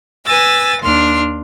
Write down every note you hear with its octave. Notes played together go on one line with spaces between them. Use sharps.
B4 G#5 E6 A6 A#6
D#2 D4 C6 F6